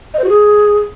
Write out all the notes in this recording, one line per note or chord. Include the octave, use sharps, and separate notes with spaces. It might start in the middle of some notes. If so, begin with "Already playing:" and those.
D#5
C5
F#4
G#4